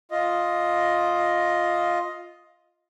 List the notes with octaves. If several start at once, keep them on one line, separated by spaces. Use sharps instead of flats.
F4 D#5